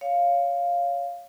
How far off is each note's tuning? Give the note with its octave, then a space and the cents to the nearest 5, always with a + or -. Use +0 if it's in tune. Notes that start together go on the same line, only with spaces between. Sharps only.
C#5 +15 F5 +0